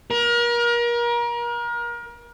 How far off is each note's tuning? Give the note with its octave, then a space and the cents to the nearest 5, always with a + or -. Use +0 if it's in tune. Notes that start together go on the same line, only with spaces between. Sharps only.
A#4 +35